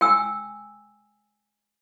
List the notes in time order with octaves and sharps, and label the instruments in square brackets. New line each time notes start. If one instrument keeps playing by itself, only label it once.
[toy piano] G5 G#5 E6